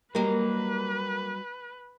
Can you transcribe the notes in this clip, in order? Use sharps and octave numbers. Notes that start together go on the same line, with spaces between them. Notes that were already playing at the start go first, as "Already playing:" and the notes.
F#3 G3 A#3 G4 A#4 B4 D#5